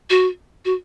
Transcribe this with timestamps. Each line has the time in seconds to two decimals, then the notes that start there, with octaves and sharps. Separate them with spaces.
0.10 F#4
0.65 F#4